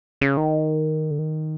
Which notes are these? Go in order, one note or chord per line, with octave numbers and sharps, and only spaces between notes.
C#3
D#3
D3
D#3